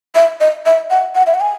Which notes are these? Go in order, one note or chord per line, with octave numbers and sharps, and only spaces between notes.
E5
D#5
E5
F#5
F#5
E5
F#5
G#5